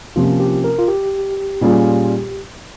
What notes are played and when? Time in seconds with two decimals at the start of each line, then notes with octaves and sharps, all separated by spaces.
0.16 C3 F3 A#3 C#4 F4
0.40 G4
0.64 A#4
0.79 F4
0.88 G4
1.61 A#2 G3 C#4 F4 G#4